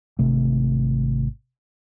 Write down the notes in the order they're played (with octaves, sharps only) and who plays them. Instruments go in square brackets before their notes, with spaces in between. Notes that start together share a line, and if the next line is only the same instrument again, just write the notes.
[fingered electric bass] G#1 C3 A3